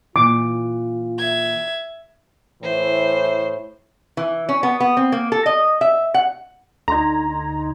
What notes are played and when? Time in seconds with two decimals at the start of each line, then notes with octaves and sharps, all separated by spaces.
0.16 A#2 E3 F4 D6
1.19 E5 G#6
2.63 A2 E3 C5
4.17 E3
4.49 C#4
4.63 B3
4.80 B3
4.97 C4
5.12 A#3
5.32 A4
5.46 D#5
5.81 E5
6.14 F#5
6.88 D2 D3 D#4 A#5 C6 G#6